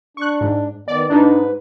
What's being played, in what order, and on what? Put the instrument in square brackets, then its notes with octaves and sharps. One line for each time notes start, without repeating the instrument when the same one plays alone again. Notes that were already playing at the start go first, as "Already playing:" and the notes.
[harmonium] D4 [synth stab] C#6 F#6
[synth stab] G#2
[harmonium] D#3 B3 [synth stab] D5
[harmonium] G#2 B4 [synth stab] D4 D#4